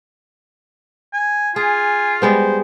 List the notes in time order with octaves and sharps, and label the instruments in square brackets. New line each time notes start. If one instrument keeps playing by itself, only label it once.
[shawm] G#5
[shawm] F4 [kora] G#4 [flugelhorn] G#5
[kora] G3 G#3 B3 [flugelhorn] C5